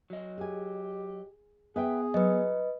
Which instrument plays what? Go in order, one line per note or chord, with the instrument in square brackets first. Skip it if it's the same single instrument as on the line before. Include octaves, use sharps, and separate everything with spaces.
[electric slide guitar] F#3 D#5
[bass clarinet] G4 [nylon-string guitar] G#4 G#5
[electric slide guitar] B3 [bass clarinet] G#4 [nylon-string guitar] B4 E5 G5
[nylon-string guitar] F#3 [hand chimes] B4 D#5